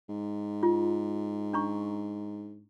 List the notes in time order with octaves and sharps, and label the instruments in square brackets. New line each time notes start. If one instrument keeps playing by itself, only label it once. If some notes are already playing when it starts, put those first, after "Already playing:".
[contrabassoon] G#2
[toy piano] F4
D4 A#5 C#6